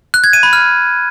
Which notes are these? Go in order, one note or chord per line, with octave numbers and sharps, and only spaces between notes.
F#6
G#6
D#7
B5
F6